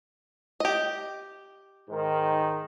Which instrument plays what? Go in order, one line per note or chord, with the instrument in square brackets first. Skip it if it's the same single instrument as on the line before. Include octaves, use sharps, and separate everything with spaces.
[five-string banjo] G4 D#5
[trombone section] G#2 D#3